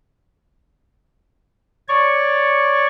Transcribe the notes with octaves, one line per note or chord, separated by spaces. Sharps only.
C#5 D5 C#6